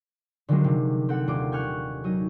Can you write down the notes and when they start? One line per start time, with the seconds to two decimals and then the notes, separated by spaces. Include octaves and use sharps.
0.49 D3 D#3 F3 F#3 G#3 D4
0.64 C3
1.09 C4 A4 F#5
1.27 D#1 F4 D6
1.52 G5 G#5 C#6 F6 F#6
2.04 F#3 D#4 D#7